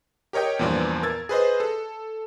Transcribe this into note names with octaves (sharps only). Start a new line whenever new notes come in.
G4 A#4 C#5 D#5 G5
E2 G2 A#2 F3 D5 C6
A#4 E6 G#6 A6
G#4 B4 C5 D#5
A4